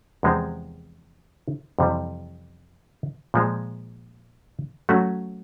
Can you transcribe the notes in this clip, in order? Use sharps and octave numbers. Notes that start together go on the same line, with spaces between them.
E2 C3 F3 G#3 C4
F2 C3 E3 G3
A#2 F3 G#3
F#3 A3 C#4 F#4